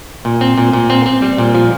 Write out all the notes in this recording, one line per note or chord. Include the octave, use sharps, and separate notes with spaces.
A#2
C4
A#2
A#2
C4
C4
G3
A#2
F3